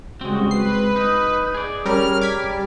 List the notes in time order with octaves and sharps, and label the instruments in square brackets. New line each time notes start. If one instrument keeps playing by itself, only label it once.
[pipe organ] C#3 G3 F#4 [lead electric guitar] G#3 C4
[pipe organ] B4 [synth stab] C7
[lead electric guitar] D#4
G#4 D5
[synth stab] G3 C#4 A#4 [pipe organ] F6
[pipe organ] G3 [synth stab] D6 G#6 B6